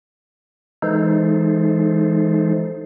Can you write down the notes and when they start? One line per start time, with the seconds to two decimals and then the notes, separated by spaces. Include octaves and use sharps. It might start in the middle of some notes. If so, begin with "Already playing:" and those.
0.82 E3 G#3 D#4 A4 C5